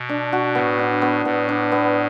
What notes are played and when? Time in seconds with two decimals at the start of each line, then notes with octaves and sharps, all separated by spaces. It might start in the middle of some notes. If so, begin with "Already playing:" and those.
Already playing: B2
0.09 D4
0.33 F#4
0.55 A2 B3
0.79 D4
1.02 B3
1.25 A2 B3
1.49 D4
1.72 B3